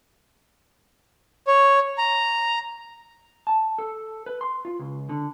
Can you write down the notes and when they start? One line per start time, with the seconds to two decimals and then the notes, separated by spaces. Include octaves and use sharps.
1.47 C#5
1.98 A#5
3.47 A5
3.78 A4
4.26 B4
4.41 C6
4.65 F4
4.79 C#2
5.09 D3